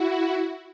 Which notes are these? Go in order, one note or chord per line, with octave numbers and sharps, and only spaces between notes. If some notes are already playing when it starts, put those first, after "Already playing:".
Already playing: E4 F#4